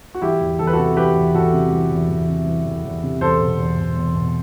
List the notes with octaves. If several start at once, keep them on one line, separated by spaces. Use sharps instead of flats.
F#4
E3 E4 G4
E2
E2 A4
B4
F#4 A4
C3
E3 G4 B4
E2
E2 F#4 A4
C3
E3
E2
E2
C3
E3
E2
E2
C3
E2 A4 C5
B2
E2
B2
E2
B2